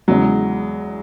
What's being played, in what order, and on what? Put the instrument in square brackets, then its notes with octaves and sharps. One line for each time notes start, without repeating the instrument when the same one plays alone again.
[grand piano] E2 C#3 G#3 [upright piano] F#3